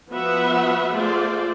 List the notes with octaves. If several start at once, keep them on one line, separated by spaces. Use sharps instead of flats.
F3 B3 F#4 B4 E5 F#5
A3 F4 G#4 C5 D5